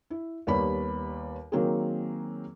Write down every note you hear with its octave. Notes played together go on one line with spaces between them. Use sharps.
E4
D#2 G3 B3 B4 C#5 B5
D#3 F#3 A#3 C4 G#4